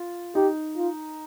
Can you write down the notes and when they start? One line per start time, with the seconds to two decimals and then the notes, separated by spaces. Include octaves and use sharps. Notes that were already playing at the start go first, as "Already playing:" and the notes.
Already playing: F4
0.35 D#4 G4
0.77 F4